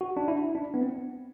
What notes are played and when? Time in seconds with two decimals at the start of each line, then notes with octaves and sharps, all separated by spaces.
0.01 F#4
0.17 D4
0.28 E4
0.55 D4
0.74 B3
0.82 C4